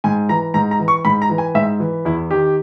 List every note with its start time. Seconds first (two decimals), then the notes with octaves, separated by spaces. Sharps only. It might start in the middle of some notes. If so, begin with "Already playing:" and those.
0.04 G#2 G#5
0.29 E3 A#5
0.54 G#2 A#5
0.71 A#5
0.80 E3
0.88 C#6
1.05 G#2 B5
1.22 A#5
1.30 E3
1.38 G#5
1.55 G#2 E5
1.80 E3
2.05 E2 E4
2.30 D#3 G4